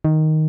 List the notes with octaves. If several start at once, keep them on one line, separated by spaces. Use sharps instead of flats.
D#3